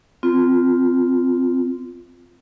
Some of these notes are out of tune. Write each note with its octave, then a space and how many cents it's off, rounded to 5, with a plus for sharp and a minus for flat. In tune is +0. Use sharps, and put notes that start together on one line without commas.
C4 -20 F4 +0